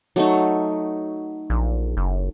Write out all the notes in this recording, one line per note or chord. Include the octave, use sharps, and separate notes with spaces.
F#3 A3 D#4
A#1
F#1